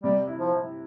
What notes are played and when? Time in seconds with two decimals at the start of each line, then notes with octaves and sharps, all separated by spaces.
0.04 C3 G3
0.27 E4
0.40 F3
0.52 E4